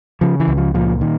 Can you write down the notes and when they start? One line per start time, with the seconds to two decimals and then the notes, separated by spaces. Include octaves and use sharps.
0.21 C#3 F3
0.40 E3
0.48 C#2
0.58 F3
0.74 A#2 F3
1.01 D#3